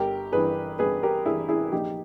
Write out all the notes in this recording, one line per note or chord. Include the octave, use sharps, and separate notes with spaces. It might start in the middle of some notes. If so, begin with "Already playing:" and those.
Already playing: G1 G4 A#4
G2 E3 G#4 B4
G1 G#4 B4
G4 A#4
G2 E3 E4 G#4
E4 G#4
A#1 D#4 G4